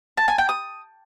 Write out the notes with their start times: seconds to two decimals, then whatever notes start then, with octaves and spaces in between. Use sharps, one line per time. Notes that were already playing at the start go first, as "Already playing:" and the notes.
0.17 A5
0.28 G#5
0.38 G5
0.49 D#6